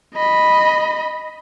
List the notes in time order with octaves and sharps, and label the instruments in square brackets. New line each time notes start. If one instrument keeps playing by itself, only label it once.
[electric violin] D#5 B5